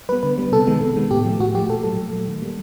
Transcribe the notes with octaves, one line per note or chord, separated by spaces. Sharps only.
G3 B3 B4
D3 B4
G3 B3
C3 A4
D#3 G#3 B3
C3
D#3 G#3 B3
A2 G4
F3 A3
A2 F#4
F3 A3 G4
A#2 A4
F#3 A3 A4
A#2
F#3 A3
D#3
G3 A#3